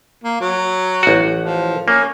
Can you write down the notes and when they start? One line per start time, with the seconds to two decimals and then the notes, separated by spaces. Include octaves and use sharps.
0.24 A#3
0.41 F#3
1.03 A1 F#4
1.42 F3
1.88 A#3 C#4